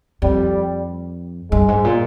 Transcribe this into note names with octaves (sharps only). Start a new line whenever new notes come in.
F2 G3
G2 G#3
G#2
A#2